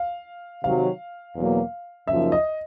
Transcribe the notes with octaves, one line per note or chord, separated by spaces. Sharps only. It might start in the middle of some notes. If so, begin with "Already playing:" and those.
Already playing: F5
C3 D#3 F#3 F5
E2 B2 F#3 A#3
F#2 C#3 F3 A#3 D#4 E5
D#5